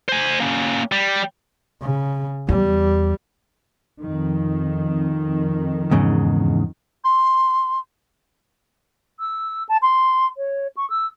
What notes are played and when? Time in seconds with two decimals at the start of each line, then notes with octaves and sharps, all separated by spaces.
0.09 C5 G#5
0.40 A#3 C#4
0.92 G3
1.82 C#3
2.49 E2 G3
4.02 F2 D#3
5.91 E2 G#2 C#3
7.04 C6
9.18 E6
9.69 A5
9.82 C6
10.37 C#5
10.77 C#6
10.90 E6